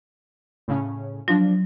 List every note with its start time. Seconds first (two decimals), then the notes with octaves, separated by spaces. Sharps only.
0.68 A2 C#3 C#4
1.28 F3 F#3 D4